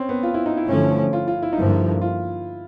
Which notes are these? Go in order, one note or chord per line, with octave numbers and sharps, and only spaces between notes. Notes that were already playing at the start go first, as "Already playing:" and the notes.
Already playing: C4 C#4
B3
F4
E4
D#4
E4
G2 D3 F3 A3 C#4
F4
F4
E4
D#4
G2 D3 F3 A#3 E4
F4